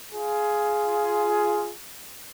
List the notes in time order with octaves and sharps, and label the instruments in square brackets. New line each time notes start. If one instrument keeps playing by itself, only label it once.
[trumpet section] F4 G#4